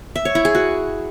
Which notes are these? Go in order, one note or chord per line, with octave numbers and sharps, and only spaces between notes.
E5
C#5
E4
G#4
F#4